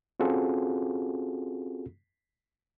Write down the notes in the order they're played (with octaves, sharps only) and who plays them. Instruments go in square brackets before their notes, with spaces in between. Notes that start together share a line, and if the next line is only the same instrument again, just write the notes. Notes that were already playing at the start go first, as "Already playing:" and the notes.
[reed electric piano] C4 C#4 F4 F#4 G#4 A4